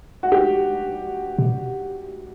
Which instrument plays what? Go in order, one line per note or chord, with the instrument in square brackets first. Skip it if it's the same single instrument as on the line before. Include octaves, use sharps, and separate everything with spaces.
[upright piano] F#4
G4
[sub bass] B2